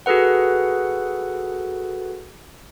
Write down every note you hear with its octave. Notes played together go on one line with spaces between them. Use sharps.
F#4 G#4 A4 B4 F#5